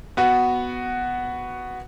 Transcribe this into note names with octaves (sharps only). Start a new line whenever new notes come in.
B3 F#4